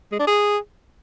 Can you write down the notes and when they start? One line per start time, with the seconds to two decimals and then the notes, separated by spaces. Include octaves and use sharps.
0.12 G#3
0.19 D4
0.27 G#4